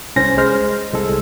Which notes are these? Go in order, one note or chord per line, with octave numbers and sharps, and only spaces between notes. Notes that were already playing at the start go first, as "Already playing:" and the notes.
C2 C#4 C5 A#6
G#3 C5 F6
C2 G#3 A4